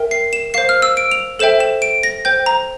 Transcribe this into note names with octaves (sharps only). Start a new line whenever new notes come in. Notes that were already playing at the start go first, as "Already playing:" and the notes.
Already playing: A#4 E5 G5
C7
E7
C5 F5 C7
F6
E6
D7
F7
A4 C5 E5 G5 E7
E7
D7
A#6
C5 G5 G6
A#5